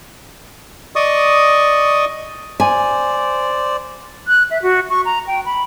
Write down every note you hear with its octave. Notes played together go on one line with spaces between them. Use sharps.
D5 D#5 C#6 D#6
C5 D5 G#5
F#6
E5
F#4
C#6
A#5
G5
B5